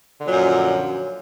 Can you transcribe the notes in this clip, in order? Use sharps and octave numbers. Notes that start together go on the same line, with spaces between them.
F#2 A#2 D3 F3 F#3